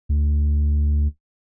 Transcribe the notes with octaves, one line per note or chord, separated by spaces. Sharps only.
D2